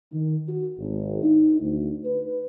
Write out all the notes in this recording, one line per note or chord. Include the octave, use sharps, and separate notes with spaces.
D#3
F#4
G#1
D#4
D2
B4